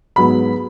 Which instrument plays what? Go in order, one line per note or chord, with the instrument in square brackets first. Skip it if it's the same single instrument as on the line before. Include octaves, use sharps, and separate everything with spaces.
[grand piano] G#2 F#3 B3 B5